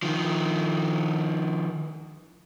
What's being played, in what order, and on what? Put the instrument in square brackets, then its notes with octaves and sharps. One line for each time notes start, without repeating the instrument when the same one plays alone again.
[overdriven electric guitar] D#3 F3